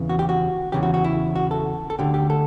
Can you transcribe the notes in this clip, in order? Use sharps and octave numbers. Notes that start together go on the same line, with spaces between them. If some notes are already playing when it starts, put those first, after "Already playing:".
Already playing: E2 C#3 E3
F#4
G4
F#4
E2 C#3 E3 G4
F#4
F#4
E4
F#4
A4
A4
D2 D3 G4
G4
A4